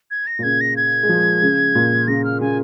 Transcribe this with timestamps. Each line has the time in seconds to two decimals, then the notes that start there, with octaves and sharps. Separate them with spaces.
0.11 G#6
0.27 A#6
0.39 A#2
0.43 C#3 G#6
0.61 A#6
0.77 G#6
1.03 G#3
1.09 F3
1.42 C#3
1.75 A#2
2.08 C#3 A#6
2.24 F6
2.41 C#3 G#5